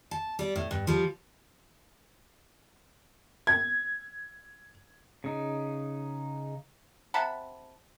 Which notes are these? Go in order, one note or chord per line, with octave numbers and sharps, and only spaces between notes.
A5
G3 D5
A2
G2
F3 G3
G#6
C#3 D#4
C3 F#5 A5 B5